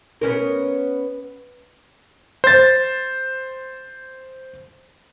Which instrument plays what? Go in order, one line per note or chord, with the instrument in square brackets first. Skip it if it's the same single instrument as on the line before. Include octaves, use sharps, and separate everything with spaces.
[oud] B3 C#4 A#4
[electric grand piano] C5 A6